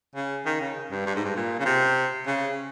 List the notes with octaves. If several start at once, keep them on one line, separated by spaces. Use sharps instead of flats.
C#3
D#3
C#3
G2
G2
G#2
G2
A#2
C#3
C3
C#3